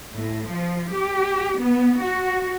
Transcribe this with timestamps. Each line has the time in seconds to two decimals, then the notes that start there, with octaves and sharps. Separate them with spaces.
0.12 A2
0.49 F3
0.92 G4
1.60 B3
2.01 F#4